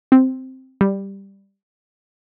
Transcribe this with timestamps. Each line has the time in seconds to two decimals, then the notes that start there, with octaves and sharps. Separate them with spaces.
0.12 C4
0.81 G3